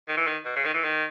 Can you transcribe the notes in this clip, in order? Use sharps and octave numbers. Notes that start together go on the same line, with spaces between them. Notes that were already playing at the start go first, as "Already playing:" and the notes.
D#3
E3
D#3
B2
C#3
D#3
E3
D#3